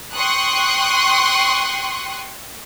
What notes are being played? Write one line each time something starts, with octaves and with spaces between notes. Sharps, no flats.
G5 C6 C#6 D#6 F#6